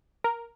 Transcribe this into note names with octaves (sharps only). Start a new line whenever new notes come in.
A#4